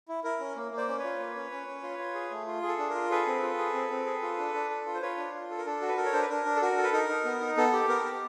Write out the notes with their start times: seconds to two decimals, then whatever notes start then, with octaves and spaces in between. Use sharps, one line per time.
0.08 E4
0.24 E4 A#4
0.40 C#4
0.56 A#3
0.71 A#3
0.77 C5 D5
0.88 C#4
0.98 B4 C#5
1.04 F4
1.20 A#3
1.36 C#4
1.51 C#4
1.68 C#4
1.83 F4
1.99 F4
2.15 G#4
2.31 A3
2.47 F4
2.62 G#4
2.68 A4
2.79 D4
2.90 A#4
2.95 F4
3.10 G#4 A4 B4
3.27 C4
3.43 F4
3.58 G#4
3.74 C4
3.90 C4
4.06 G#4
4.22 F4
4.38 D4
4.54 D4
4.70 A4
4.86 F4
4.94 C5
5.02 F4 B4 C#5
5.17 D4
5.34 F4
5.50 A4
5.58 A#4
5.66 D4 A4
5.81 F#4
5.88 B4
5.97 A4 A#4
6.05 C#5
6.13 D4 C5
6.21 B4
6.29 D4 A#4
6.45 D4
6.56 A4
6.61 F#4 A#4
6.77 A4
6.84 B4
6.93 D#4 A#4
7.09 D#4
7.25 B3
7.41 D#4
7.57 B3 A4
7.73 G4
7.88 B3 A#4
8.04 G4